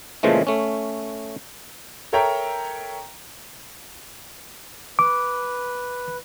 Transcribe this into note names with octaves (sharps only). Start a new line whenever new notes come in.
A#2 C#3 E3 F3 G#3 A3
A3 C#4
A4 A#4 C#5 E5 G5 A#5
B4 D6